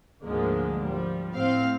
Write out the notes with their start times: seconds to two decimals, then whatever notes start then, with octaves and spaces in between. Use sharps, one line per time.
0.23 D2 G#2 D3 F3 G#3 A#3
0.81 F3 G3
1.33 A2 C4 F5